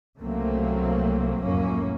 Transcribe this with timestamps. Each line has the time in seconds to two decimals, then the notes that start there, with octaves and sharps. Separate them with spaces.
0.18 C2 C#3 F#3 A3 A#3 C4
1.40 F1 C#2 F#2 A2 A#3 C#4